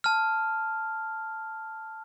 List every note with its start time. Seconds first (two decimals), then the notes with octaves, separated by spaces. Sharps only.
0.04 A5 F6